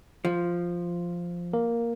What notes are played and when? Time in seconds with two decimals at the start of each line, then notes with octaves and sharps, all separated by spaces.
0.25 F3
1.53 A#3 A#4